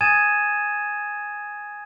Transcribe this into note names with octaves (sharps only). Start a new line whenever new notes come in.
G#5 D#6 G#6 A6 D#7 E7